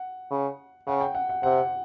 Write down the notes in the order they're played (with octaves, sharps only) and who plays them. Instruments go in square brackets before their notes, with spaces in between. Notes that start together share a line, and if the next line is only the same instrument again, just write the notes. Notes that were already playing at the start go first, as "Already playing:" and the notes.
Already playing: [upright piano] F#5
[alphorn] C#3
[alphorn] C#3 [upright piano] F#5
[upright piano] G5
F#5
F#5
[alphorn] C3 [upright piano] F#5